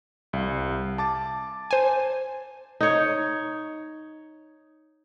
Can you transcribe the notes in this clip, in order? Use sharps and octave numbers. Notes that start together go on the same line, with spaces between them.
C2 F5
A5 D6 A6
C5 G#5
D#4 C#5